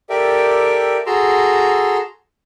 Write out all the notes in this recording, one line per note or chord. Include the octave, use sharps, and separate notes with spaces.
G4 A4 A#4 D5 E5 G5
F#4 G#4 A4 A#5 C6 E6